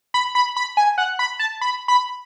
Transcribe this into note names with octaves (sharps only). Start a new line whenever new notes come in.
B5
B5
B5
G#5
F#5
B5
A5
B5
B5